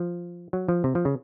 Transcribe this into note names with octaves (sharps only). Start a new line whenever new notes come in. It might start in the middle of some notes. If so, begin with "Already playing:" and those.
Already playing: F3
F#3
F3
C3
F3
C#3